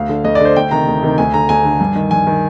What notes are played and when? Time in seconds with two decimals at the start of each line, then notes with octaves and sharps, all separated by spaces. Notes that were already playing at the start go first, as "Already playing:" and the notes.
Already playing: D2 F5
0.09 D3
0.24 D2 D#5
0.35 D5
0.40 D3 C5
0.56 D2 G5
0.71 C3 D#3 A#5
0.87 D2
1.02 C3 D#3
1.18 D2 G#5
1.34 D3 A#5
1.49 D2 G#5
1.65 D3
1.80 G2
1.95 D#3
2.11 G2 G#5
2.27 D#3